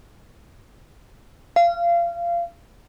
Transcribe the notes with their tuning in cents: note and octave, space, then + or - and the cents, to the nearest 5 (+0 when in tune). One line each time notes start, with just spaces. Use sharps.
F5 -25